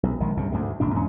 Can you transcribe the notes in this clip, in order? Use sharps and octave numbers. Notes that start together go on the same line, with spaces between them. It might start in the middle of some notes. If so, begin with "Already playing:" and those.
B1
A#1 D#3 G#3
C2 G2 C#3
D2 G#2 D3
G1 D#2 A#2 D4
E2 G#2 C#4